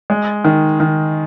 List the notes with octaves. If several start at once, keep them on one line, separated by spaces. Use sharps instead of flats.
G#3
D#3
D#3